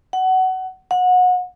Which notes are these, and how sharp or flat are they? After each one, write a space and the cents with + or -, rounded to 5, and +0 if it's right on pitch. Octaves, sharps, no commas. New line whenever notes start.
F#5 +20
F#5 -25